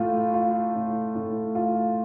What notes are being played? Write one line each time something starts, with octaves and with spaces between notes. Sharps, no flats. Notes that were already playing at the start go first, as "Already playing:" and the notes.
Already playing: A2 A3 F4
F4
A2
A2
F4